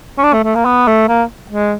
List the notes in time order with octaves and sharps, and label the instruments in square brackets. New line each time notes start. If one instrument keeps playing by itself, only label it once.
[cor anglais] C#4
D4
A3
A3
A#3
B3
A3
A#3
G#3